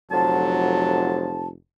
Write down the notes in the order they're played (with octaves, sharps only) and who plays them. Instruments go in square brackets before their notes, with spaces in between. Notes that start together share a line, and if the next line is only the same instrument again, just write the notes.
[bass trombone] F1 [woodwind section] D3 F3 A5 [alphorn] F#3